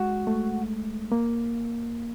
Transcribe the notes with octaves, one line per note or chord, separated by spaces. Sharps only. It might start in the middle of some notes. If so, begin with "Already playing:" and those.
Already playing: G#3 F#4
A3
A#3